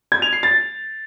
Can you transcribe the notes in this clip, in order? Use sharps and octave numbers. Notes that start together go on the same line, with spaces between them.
G#6
F7
C7
A6